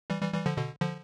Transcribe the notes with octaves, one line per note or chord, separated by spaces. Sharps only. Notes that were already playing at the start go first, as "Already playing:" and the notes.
E3 G3
E3 G3
E3 G3
D3 F3
B2 D3
D3 F3